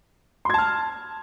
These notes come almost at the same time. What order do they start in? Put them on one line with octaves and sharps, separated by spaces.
C6 G#6 A5 F6